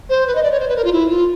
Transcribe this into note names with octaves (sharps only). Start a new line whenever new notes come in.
C5
B4
D#5
D5
C#5
C5
B4
A#4
F4
E4
F4